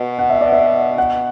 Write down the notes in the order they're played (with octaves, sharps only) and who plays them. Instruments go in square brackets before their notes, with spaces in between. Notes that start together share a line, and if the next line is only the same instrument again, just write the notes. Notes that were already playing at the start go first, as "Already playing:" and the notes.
Already playing: [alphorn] B2
[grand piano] F#5
E5
D5
E5
F#5